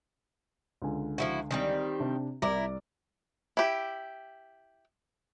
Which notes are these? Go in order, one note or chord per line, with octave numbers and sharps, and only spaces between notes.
C#2 D3 G#5
F3 E4 F#4
D#3 G3 C4
C3 D4
C2 E4 A#4 D5 D6
E4 G4